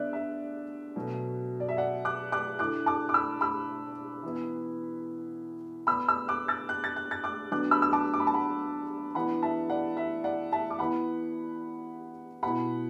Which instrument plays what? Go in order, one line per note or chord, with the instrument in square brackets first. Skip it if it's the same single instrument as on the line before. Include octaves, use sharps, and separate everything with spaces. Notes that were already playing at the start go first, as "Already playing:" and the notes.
Already playing: [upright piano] D3 B3 D4 D5 E5 F#6
E5
B2 F#3 A3
D5
E5
D5 F#5
D6 F#6
D6 F#6
D3 A3 E4 D6 F#6
A5 D6
D6
B5 E6
B5 E6
E3 B3 E4
D3 B3 D4 B5 E6
B5 E6
D6 F#6
E6 A6
F#6
A6
F#6
A6
D6 F#6
D3 F#3 B3 D4 D6 F#6
B5 E6
E6
A5 D6
D6
B5
A5
F#5 B5
E3 B3 D4 F#5 B5
E5 A5
D5 F#5
E5
D5 F#5
E5 A5
D6
E3 B3 E4 F#5 B5
B2 B3 E4 F#5 B5